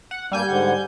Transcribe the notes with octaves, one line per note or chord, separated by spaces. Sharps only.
F#5
G2 G3 A#3 D4 G#5 G6
G#2 D3 F#5